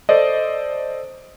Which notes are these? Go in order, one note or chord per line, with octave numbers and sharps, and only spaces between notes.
A4 C5 D5 D#5